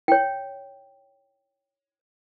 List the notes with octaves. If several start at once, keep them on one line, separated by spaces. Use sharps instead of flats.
C#5 G5